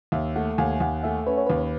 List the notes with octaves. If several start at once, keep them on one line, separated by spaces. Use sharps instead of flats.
D#2 E5
A3 F#5
D#2 G#5
D#2 F#5
A3 E5
C#4 B4
C#5
D#2 B4